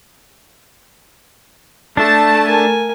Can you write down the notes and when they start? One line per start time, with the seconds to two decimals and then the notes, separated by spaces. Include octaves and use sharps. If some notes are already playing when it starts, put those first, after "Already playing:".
1.97 A3 D4 A5
2.46 A#4 G#5